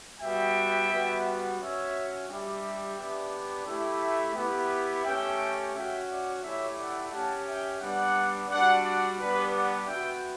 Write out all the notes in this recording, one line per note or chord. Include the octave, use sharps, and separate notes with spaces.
G3 B3 F#4 E5 G5
G3 B3 F#4
C#4 F#4 C#5 E5
G3 D4 G4 E5 G5
B3 D4 G4
A3 E4 G4
B3 E4 G4
A3 C#4 G4 E5 G5
C#4 F#4 E5 G5
D5 F#5
A3 E4 G4 C#5 E5
D5 F#5
C#4 G4 F#5 A5
E5 G5
G3 B3 D4 D5 F#5
G3 D4 F#4 D5 F#5
D5 F#5
G3 B3 D4 G4 B4 D5
D5 F#5
B3 F#4 E5 G5